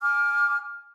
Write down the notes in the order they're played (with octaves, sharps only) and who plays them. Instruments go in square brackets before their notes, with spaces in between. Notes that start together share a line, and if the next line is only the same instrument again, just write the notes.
[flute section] G#5 D6 F6